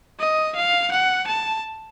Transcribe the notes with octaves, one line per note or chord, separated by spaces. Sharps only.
D#5
F5
F#5
A5